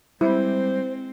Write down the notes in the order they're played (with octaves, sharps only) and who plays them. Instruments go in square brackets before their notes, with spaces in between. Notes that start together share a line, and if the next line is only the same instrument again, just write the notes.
[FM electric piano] G3 [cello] G#3 C4 [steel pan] E4 [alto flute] C5